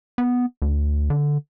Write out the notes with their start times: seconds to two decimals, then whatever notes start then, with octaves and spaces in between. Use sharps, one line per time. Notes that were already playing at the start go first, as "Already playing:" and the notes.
0.18 B3
0.62 D2
1.10 D3